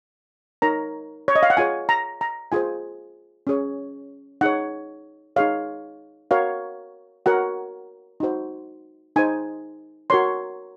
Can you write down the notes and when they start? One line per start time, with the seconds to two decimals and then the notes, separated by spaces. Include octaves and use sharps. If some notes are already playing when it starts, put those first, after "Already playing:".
0.62 D#4 A#4 C#5 A#5
1.28 C#5
1.36 D#5
1.43 F5
1.50 F#5
1.57 F4 G#4 C#5 G#5
1.89 A#5
2.21 A#5
2.52 F4 G#4 C5 G#5
3.47 C#4 G#4 C#5
4.41 D#4 G#4 C#5 F#5
5.36 D#4 G#4 C#5 F5
6.31 F#4 A#4 C#5 F5
7.26 F#4 A#4 C#5 F#5
8.20 D#4 F#4 C5
9.16 D#4 G#4 C5 G#5
10.10 F#4 A#4 C#5 C6